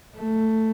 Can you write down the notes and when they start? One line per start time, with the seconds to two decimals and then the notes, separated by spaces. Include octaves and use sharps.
0.17 A3